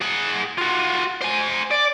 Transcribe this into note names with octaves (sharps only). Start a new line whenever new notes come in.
G#4 F#5
F4 F#4
C5 G#5
D5